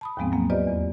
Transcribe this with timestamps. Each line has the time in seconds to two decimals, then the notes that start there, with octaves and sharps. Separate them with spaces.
0.01 A5 B5 D#6
0.17 D#2 G#2 F3 G#3 B3 C4
0.32 F#3 A#3
0.50 F4 G4 B4 C5 D5 D#5
0.67 E2